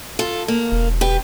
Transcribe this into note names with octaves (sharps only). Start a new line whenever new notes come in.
F4 A4
A#3
E1
G4 B4